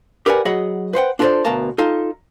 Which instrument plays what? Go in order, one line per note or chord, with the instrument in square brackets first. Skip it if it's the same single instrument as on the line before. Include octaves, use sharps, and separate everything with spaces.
[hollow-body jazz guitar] G4 A#4 B4 D5 F#5 G#5
F#3 G#4 D#5 F#5 B5
B4 C5 F#5 G5
D4 F4 A4 A#4 C5 D5
D2 B2 A#4 F5 A5 A#5
D#4 F4 A4